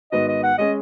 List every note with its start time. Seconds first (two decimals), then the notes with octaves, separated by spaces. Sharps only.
0.12 G#2 D#3 B3 F#4 D#5
0.28 D#5
0.43 F#5
0.58 G#3 C#4 G#4 D#5